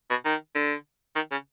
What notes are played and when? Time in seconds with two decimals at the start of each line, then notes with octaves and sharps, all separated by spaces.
0.10 B2
0.25 D#3
0.55 D3
1.16 D#3
1.32 C#3